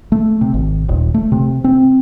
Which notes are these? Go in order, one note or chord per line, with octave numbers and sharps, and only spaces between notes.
A3
C3
G#1
D#1
A3
C3
C4